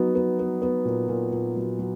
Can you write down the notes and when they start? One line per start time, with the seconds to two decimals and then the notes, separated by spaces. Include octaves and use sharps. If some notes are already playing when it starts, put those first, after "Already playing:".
Already playing: F#3 B3 D#4
0.15 B3
0.39 B3
0.62 B3
0.85 A#2
1.09 A#2
1.32 A#2
1.56 F#3
1.79 F#3